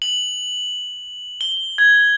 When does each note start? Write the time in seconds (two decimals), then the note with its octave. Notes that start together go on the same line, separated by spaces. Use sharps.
0.02 F#7
1.41 G7
1.78 G#6